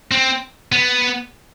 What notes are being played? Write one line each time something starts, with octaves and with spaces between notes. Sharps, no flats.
C4
B3